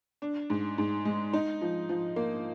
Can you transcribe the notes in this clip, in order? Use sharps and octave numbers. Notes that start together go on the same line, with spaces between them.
D4
G#2
G#2
G#3
D#4
F3
F3
A#3